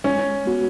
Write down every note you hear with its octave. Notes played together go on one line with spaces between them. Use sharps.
G#3 C#4
B3 F#4